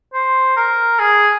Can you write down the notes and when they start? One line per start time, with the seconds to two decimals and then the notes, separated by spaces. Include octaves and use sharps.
0.14 C5
0.57 A#4
0.99 G#4